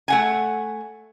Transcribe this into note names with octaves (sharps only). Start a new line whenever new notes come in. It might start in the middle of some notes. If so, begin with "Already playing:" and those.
A3 F#5 G#5